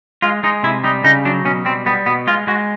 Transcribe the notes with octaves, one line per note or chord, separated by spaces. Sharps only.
G#3 F4
G#3 D#4
C3 E4
G3 D#4
C#3 D#4
F#3 D4
B2 C#4
G3 C4
G3 B3
B2 B3
G#3 F4
G#3 F#4